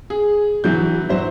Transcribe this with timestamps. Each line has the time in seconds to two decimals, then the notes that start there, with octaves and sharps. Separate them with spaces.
0.10 G#4
0.64 E3 F#3 G6
1.09 F#3 C5 E5